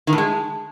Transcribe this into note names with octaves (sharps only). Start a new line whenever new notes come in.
D#3
A2
G#3